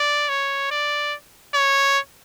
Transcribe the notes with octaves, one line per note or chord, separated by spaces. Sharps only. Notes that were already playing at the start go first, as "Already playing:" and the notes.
Already playing: D5
C#5
D5
C#5